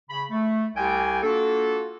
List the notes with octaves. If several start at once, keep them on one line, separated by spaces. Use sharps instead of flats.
C#3 B5
A3
C2 G4 G5 G#5
A#3 D4 F4 F#4 A4